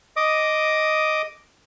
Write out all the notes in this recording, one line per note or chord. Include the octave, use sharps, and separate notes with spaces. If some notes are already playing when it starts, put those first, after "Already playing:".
D#5 D6 D#6